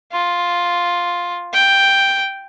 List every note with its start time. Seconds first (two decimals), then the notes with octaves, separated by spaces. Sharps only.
0.12 F4
1.53 G5